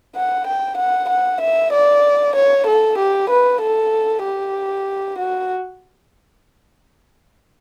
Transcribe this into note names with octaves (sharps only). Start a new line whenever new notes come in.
F#5
G5
F#5
F#5
E5
D5
C#5
A4
G4
B4
A4
G4
F#4